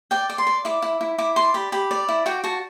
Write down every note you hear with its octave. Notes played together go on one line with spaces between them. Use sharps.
D5 G5
D5
C6
D5
E4 D6
E4
E4
E4 D6
D5 C6
G4 B5
G4 B5
D5
E4
F#4 G5
F#4 A5